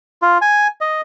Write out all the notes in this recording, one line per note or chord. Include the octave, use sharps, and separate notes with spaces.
F4
G#5
D#5